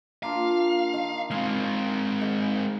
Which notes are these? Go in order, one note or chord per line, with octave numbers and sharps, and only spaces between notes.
A#3 D4 F4 F5
D#3
G#3 C4 F5
G#2